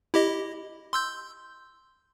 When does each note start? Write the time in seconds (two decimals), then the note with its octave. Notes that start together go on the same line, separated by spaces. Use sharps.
0.14 E4 G4 D#5
0.93 C6 E6 G6